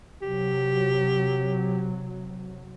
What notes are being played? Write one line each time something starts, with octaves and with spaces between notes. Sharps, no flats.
C3 F#3 G4